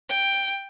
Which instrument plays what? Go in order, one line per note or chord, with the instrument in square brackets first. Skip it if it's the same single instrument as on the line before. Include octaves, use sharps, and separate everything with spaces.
[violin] G5